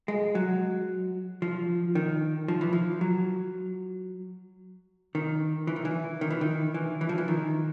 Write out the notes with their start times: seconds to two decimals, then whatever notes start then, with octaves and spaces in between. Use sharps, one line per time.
0.08 G#3
0.35 F#3
1.42 F3
1.95 D#3
2.48 F3
2.61 E3
2.73 F3
3.01 F#3
5.15 D#3
5.67 E3
5.76 D#3
5.85 E3
6.21 D#3
6.31 E3
6.41 D#3
6.74 E3
7.01 E3
7.09 F3
7.18 E3
7.28 D#3